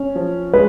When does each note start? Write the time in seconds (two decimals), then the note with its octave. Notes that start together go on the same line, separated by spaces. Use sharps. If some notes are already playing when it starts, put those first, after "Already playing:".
Already playing: C#4
0.16 F3
0.54 G#3 B4